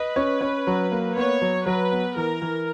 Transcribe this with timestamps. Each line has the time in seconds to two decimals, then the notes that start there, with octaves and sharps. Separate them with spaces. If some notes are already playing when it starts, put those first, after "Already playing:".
Already playing: B4 D#5
0.16 C#4
0.41 C#4
0.67 F#3
0.92 A#3
1.16 B3 C#5
1.42 F#3
1.66 F#3 B4
1.92 B3
2.16 E3 A#4
2.42 E3